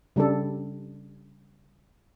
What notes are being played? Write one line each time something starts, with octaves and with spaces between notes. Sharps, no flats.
C#3 G3 D4 A4